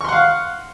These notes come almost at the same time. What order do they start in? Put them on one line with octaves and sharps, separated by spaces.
C#6 C6 F#5 F5